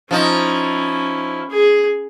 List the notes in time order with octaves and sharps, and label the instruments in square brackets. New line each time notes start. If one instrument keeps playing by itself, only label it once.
[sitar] F3 D#4 [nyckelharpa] C#4 E4
[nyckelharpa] G#4